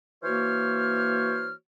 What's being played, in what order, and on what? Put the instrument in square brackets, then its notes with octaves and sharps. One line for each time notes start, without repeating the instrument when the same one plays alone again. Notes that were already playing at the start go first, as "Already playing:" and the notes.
[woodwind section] E3 A#3 F#4 C5 C#5 F6